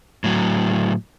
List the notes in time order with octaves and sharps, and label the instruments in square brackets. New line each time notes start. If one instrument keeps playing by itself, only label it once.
[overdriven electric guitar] A2 F#3